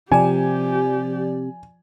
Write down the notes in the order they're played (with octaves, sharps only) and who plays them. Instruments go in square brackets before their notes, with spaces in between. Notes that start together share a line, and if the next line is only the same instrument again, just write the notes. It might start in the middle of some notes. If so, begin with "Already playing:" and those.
[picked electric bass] C3 [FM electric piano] F3 D5 [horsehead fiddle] G4 [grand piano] G#5